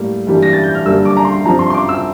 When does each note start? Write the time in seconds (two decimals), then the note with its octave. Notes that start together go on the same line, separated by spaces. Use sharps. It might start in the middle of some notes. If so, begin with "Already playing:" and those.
Already playing: A2 G3 A#3
0.27 G2 E3 G3 A#3
0.43 A#6
0.53 A6
0.64 G6
0.75 F6
0.86 G2 D3 G3 A#3 E6
1.05 D6
1.17 A#5
1.25 C6
1.45 G2 F3 C4 A#5
1.59 C6
1.70 C6
1.74 D6
1.89 E6